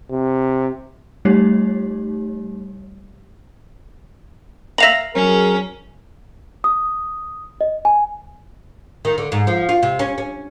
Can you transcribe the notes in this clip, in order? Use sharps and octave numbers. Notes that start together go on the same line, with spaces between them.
C3
G3 A3 D#4 G4 C#5
E5 F5 A#5 A#6 F7 F#7
F#3 C#4 G#4 A#4
D#6
D#5
G#5
D#3
D3
G#2
F3
F4
C3
C#4
C#4